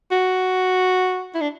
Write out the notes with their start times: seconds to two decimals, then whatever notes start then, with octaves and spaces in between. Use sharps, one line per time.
0.11 F#4
1.35 E4
1.41 D4